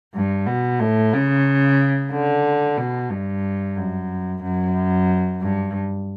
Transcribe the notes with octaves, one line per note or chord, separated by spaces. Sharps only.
G2
B2
A2
C#3
D3
B2
G2
F#2
F#2
G2